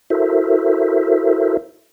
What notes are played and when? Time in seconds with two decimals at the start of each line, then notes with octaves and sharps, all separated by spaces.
0.10 E4 F#4 A4 A#4 C5 E5